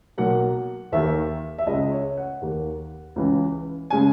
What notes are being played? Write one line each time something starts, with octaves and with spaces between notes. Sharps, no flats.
B1 B2 F#3 A#3 F#5
D#2 D#3 A#3 E5
E5
C#2 C#3 G#3 D#5
C#5
F#5
D#2 D#3 A#3
C#2 C#3 E3
C#3 G#3 G#5